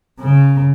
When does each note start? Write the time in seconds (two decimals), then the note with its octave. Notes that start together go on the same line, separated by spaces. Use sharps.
0.20 C#3